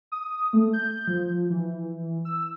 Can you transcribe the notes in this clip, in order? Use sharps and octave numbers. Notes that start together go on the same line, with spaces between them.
D#6
A3
G6
F3
E3
E6